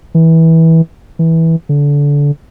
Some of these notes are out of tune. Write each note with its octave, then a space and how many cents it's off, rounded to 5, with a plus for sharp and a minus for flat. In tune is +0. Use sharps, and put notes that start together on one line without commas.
E3 -20
E3 -15
D3 -25